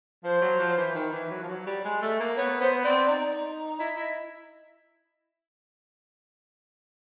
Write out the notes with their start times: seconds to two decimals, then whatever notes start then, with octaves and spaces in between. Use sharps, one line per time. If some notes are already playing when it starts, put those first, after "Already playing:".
0.24 F3 C5
0.42 F#3
0.59 F3
0.77 E3
0.95 D#3
1.13 E3
1.30 F#3
1.43 F3
1.48 F#3
1.66 G3
1.85 G#3
2.02 A3
2.19 A#3
2.37 B3 C#5
2.60 B3 C5
2.84 C4 D5
3.08 D#4
3.79 E4 D#5
3.97 E4